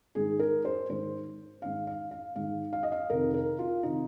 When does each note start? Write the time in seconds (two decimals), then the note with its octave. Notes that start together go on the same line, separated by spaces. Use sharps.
0.15 G#2 D#3 G#4
0.39 A#4
0.65 C5
0.89 G#2 D#3 C5
1.62 G#2 D#3 F5
1.87 F5
2.11 F5
2.36 G#2 D#3 F5
2.73 F5
2.83 D#5
2.92 F5
3.10 F2 C3 D#3 A#4
3.34 A#4
3.59 F4
3.83 C3 D#3 D#4